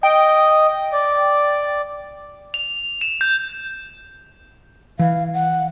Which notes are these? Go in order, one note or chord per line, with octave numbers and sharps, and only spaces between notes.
D#5 G5
D5
F7
E7
G6
E3 F5
F#5